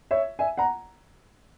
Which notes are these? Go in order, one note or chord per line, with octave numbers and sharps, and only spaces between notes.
C#5 E5
E5 G#5
F#5 A#5